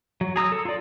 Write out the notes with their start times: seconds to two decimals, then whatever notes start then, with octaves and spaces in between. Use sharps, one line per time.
0.21 F#3
0.36 G#4 A#5 D#6 E6
0.52 A4
0.65 F4 D5